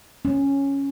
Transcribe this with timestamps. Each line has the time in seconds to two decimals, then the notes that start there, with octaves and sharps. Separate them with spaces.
0.25 C#4